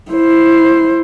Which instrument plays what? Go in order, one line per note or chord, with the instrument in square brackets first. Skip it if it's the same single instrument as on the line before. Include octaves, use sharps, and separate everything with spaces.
[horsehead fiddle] E4 C5